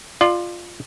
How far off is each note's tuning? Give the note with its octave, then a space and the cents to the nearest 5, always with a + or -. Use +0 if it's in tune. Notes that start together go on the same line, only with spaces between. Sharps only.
F4 +0 D5 +35